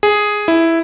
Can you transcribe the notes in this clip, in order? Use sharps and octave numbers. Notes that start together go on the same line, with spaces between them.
G#4
E4